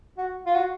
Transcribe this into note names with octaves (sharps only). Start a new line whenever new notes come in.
F#4
F4
F#4